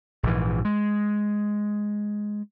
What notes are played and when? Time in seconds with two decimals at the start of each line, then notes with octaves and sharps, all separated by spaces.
0.23 A#1 G#2 E3
0.65 G#3